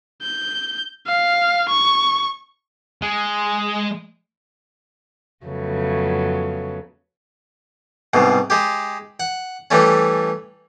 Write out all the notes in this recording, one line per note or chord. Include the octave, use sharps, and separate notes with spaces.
G6
F5
C#6
G#3 G#4
F2 C#3 F#3 A3 B3
C2 G#2 B2
G#3 G4
F#5
E3 G3 A3 C#4